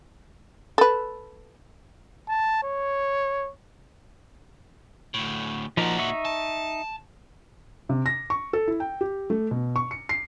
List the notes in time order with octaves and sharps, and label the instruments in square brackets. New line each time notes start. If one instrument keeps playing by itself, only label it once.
[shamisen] A4 B4
[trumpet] A5
C#5
[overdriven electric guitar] D2 A2
[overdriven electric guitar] A#2 F#4 [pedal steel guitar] F3 D#4 A#4
[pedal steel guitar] D#4 E5 C#6
[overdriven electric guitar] A5
[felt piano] C3
A#6
C#6
A4
E4
G5
G4
A3
B2
C#6
C#7
C7